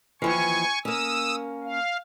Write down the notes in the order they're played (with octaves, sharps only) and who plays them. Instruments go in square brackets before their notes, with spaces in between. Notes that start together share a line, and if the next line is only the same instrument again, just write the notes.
[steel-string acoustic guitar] D#2 E3 F3 [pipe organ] G#5 C#6
[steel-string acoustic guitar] A#3 C#4 [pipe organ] D#6 E6
[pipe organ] F5